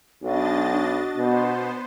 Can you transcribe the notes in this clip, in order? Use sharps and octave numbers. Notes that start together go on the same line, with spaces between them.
B1 D4 F#4 D#5 A6
B2 B3 C5